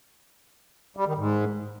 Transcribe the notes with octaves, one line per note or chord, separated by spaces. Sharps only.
G3
D#3
G#2